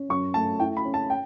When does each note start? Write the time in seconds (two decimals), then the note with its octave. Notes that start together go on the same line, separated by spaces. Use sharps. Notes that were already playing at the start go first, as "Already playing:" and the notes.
Already playing: C#4
0.09 F#2 C#6
0.34 A3 A5
0.60 E4 G5
0.77 B5
0.85 C#4
0.94 A5
1.10 G5